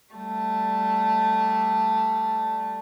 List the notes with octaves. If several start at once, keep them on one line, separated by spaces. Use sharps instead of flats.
G3 A3